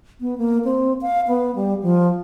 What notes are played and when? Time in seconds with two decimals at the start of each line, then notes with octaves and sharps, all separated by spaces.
0.21 B3
0.38 A#3
0.65 C4
1.01 F5
1.28 B3
1.55 G3
1.82 F3